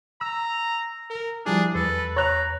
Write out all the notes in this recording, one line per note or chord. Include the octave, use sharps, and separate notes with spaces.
A#5 E6
A#4
F3 G3 D4 E4 G#4
E2 A4 B4
C#5 A#5 F#6 F7